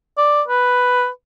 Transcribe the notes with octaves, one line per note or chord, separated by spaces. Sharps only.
D5
B4